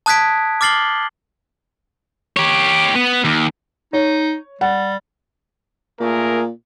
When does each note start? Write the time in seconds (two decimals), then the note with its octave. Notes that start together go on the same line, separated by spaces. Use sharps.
0.06 A5 D#6 F#6 G#6 B6 D7
0.61 D6 F6 A6 C7 F#7 G7
2.37 G4 C#5
2.95 B3
3.24 D#2
3.93 D#4 C#5
4.61 G3 F#5
6.00 A#2 A3 G#4 A#4